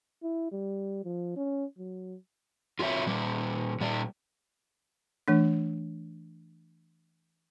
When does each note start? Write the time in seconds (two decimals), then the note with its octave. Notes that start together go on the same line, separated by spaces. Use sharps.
0.23 E4
0.52 G3
1.04 F3
1.37 C#4
1.79 F#3
2.79 F4 F#4 C#5 D#5 E5
3.07 A#2 G3
3.80 A#2 G3 D5
5.28 E3 A3 D4